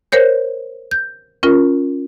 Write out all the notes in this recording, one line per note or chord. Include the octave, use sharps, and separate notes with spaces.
A#4 C5 C#5 G6
G6
C#4 F4 A#4